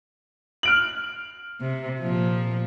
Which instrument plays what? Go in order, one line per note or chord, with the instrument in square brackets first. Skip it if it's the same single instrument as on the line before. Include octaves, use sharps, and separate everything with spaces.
[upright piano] F6 D7 F#7
[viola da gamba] C3
A#2 F3